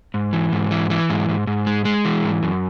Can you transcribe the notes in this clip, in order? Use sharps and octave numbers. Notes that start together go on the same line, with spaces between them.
G#2
E3
G#2
E3
E3
G#2
G#2
G#2
G#3
G#3
E3
G#2
F#2